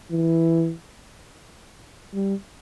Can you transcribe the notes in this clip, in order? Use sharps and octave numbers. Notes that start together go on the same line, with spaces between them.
E3
G3